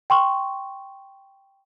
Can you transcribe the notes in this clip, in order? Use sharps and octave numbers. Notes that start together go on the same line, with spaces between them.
G5 C6 C#6